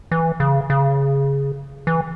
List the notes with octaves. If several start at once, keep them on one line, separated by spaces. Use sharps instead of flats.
E3
C#3
C#3
E3